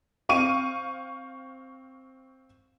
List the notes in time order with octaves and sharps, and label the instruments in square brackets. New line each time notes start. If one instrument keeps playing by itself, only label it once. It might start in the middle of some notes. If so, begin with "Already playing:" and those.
[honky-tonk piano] C4 F5 C#6 D#7